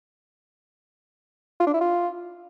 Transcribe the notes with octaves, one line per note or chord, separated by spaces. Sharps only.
F4
D4
E4
F4